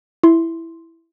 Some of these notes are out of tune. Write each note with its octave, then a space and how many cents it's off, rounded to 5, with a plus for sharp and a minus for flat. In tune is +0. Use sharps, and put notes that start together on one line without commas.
E4 +0 C6 +0